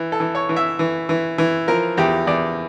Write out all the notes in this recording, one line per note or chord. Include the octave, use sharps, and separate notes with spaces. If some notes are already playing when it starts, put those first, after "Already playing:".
Already playing: E3
A4
E3
C#5
E3
E5
E3
E3
E3
F3 A#4
E2 G4
E2 D5